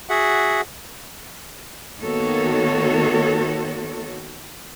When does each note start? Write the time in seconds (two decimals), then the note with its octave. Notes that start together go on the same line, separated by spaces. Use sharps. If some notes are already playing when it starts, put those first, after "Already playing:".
0.10 F#4 G#4 E5 F#5
2.00 D#3 A#3 B3 F#4 A4 C#5